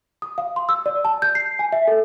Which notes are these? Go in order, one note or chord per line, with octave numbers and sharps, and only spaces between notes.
D#6
F5
C6
E6
D5
A5
G6
C7
G#5
E5
A4